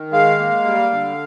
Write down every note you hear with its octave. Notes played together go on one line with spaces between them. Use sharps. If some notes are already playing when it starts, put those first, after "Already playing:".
Already playing: D#3
G#3 F5
A#3
G3
D3